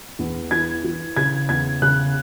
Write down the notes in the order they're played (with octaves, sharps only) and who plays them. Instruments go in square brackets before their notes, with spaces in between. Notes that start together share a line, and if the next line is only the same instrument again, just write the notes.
[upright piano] E2
E3 G#6
E3
C#3 G#6
E2 G#6
C#3 F#6